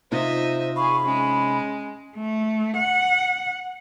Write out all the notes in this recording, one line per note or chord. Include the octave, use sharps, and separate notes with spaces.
C3 D#4 F4 C5 D#5 E5
G#4 F5 B5 C#6
G#3 C#4
A3
F#5